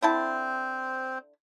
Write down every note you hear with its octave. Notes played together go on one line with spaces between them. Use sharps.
D3 C4 E4 C5 A5